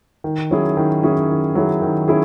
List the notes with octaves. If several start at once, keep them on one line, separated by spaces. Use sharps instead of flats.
D#3
F#3 C#4 E4 G#4
D#3
F#3 C#4 E4 G#4
D#3
F#3 C#4 E4 G#4
D#3
C#4 E4 G#4